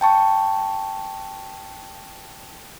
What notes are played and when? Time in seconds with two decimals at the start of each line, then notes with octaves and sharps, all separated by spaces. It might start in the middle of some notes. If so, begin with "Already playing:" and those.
0.01 G5 A5 C#6